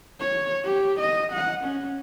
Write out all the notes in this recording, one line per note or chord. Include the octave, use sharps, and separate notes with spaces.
C#5
G4
D#5
F#5
C#4